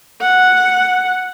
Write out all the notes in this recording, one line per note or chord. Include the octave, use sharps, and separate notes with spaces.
F#5